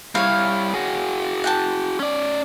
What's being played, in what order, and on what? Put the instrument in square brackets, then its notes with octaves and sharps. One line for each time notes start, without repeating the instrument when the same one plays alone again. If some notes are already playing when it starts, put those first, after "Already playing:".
[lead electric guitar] G3 E4 [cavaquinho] C#5 F5
[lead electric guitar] F#4 G#4
[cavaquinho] F#5 G5 A5
[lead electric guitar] C#4 D5